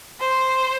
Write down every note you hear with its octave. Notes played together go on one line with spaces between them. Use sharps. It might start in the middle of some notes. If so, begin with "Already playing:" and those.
C5